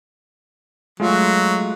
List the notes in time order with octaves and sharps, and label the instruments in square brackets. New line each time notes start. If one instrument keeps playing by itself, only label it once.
[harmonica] F#3 [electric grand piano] G#3 A3 F4